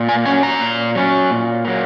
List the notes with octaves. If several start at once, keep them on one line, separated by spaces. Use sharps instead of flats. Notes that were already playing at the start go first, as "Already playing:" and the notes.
Already playing: A#2
G#5
F#3 C#4 G#5
A#5
A#2
F#3 C#4
A#2
F#3 A#3